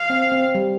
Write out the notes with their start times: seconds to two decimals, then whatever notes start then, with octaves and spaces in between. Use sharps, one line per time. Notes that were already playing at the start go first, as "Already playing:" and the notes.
Already playing: F5
0.10 C4
0.32 C4
0.55 G3